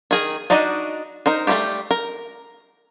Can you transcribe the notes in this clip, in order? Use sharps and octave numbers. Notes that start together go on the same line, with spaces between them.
D#3 G#4 A#4
D4 D#4 F#4 D5 D#5
D#4 A#4 C5
G3 A3 C4 F4 G4
A#4